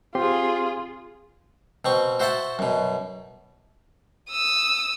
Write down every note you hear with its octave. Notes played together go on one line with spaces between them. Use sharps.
C4 F4 G4 G#4 C6
B2 C4 C#6
F#4 C5 E5 F#5 A5
F#2 B2
D#6 E6